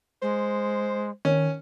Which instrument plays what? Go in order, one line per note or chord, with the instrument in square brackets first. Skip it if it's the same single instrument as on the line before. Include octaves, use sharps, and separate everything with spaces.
[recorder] G#3 [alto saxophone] C5
[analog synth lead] D#3 [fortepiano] C#4